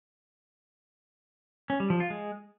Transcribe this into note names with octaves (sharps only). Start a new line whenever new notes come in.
C#4
G3
F3
F4
G#3